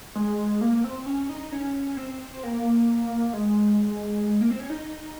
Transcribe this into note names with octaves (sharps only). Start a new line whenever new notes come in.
G#3
A#3
C4
C#4
D#4
C#4
C4
A#3
G#3
A#3
C4
C#4
D#4